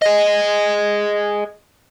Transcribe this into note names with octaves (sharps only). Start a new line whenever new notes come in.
G#4 D#5